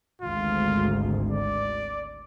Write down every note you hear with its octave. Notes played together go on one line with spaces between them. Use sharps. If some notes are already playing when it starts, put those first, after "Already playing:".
G#1 D2 G#3 F4
D5